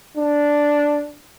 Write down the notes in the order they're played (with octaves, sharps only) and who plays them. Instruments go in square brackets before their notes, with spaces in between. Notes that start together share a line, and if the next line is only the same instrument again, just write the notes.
[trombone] D4